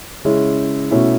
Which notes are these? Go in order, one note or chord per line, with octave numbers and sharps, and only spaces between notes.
C#3 G#3 C#4 E4
B2 A3 C#4 E4